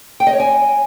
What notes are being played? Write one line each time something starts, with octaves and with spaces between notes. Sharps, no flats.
G5
D#5
C#5
G#5